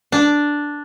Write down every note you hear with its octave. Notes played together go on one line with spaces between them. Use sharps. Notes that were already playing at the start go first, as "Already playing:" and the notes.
D4